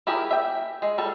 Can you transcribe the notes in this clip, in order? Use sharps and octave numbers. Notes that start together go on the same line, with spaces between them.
E4 G4 G#4 A#4
E5 G5
G#3
G3 A4